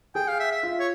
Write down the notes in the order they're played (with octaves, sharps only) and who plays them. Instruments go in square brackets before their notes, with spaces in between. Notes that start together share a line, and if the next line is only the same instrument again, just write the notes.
[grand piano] G#4 [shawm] G5
[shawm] F5
E5
E5
[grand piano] F4
[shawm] C#5